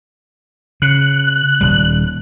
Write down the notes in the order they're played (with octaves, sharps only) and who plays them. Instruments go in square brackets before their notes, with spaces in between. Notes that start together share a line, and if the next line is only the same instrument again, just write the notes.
[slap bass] C#3 [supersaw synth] F#6
[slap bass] D#1 G3